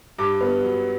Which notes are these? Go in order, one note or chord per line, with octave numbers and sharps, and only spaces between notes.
G2 D6
B3
F#3